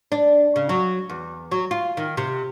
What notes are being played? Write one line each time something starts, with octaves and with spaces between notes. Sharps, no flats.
D4
C#3
F#3
E2
F#3
F4
D#3
C3